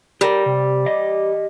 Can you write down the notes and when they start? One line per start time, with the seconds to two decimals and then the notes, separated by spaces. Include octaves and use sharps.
0.21 G3 G4 A#4
0.46 C3
0.86 G4 D#5